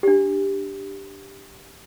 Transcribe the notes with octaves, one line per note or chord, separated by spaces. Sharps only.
D4 G4